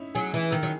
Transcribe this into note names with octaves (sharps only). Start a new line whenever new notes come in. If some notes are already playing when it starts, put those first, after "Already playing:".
Already playing: C#4 D#4 E4
F#3 G#4
E3
D#3 A#4
F#3